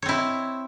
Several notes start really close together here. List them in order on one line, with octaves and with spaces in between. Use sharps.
C#5 C4 E4